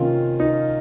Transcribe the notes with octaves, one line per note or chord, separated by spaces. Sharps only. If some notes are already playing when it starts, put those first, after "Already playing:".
Already playing: C3 D#3 A#3 C#4 F4
D#4